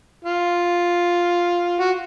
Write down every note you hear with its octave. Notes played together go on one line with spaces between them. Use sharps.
F4
F#4